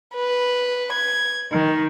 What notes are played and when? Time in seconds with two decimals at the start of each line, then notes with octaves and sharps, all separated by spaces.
0.15 B4
0.93 G#6
1.51 D#3